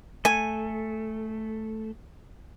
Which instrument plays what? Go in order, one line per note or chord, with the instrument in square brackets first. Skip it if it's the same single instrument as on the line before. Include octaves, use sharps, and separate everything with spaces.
[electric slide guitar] A3 A4 [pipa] G#5